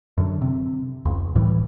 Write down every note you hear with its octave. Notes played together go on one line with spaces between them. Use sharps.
F#2 D3
C3
F1 C#2
C#2 A2 E3 G3